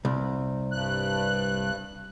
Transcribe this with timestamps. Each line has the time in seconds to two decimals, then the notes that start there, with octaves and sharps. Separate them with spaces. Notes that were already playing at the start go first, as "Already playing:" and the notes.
0.05 C2
0.72 G2 F#6